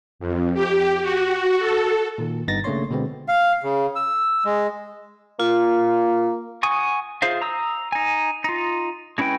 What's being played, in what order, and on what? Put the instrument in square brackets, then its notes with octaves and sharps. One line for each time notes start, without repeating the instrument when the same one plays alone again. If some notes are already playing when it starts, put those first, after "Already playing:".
[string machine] F2
G4
F#4
A4
[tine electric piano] A#2 D#3
G1 G2 B3 D#4 A6 A#6
C#3 A3 A#3 D4 C#5 C6
B2 D3 G#3 B3 C4
[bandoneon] F5
C#3
E6
G#3
[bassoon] A#3 [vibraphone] F4
[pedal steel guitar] F#5 G#5 C#6 D#6
F4 G#4 C5 E5 F5
A#5 D#6 E6
D#4 G#5
D#4 F4
G#3 C#4 E4 B4 G5